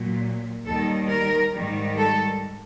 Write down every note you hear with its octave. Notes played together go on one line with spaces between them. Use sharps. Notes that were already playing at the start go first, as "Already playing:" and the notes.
Already playing: A#2 F#3
D#2 D#3 G3 A4
A#4
G#2 D#3 G3
A4